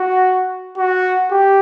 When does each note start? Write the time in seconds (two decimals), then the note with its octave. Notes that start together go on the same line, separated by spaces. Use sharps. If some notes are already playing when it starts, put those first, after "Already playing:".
Already playing: F#4
0.77 F#4
1.31 G4